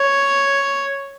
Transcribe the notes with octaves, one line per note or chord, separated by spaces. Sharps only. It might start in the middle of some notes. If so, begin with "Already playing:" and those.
Already playing: C#5